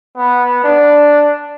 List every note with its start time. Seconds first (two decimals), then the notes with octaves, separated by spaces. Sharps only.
0.17 B3
0.64 D4